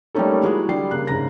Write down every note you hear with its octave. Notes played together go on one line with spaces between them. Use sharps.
G3 A3 A#3 C#4 D#4 A4
G#3 E4 F#4 G#4
D3 G3 C7
C#3 A#3 F#6
G#2 C#3 A#5 A#6